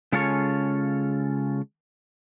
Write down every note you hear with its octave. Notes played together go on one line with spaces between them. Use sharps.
C#3 G#3 C#4 F4 A4 C#5